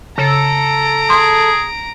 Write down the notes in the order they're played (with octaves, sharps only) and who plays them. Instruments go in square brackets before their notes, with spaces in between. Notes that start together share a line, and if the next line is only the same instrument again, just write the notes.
[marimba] C#3 [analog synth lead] A4 [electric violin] A#5 D7
[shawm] G#4 [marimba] C6